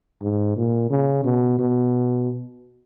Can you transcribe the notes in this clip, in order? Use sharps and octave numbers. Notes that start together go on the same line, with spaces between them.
G#2
A#2
C#3
B2
B2